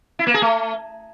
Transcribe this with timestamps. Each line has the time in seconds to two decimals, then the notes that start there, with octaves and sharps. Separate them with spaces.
0.19 E4
0.27 A#3
0.34 G#4
0.42 A3